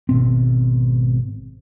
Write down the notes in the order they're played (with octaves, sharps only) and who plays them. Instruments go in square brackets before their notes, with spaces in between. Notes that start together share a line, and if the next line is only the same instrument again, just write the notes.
[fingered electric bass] G#1 B2 C4